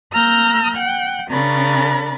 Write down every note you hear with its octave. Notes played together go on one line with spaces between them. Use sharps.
A#3 A#5 E6 F6 G6 A#6
F#5 G5
C#3 C#4 D4 A#4 B5 A6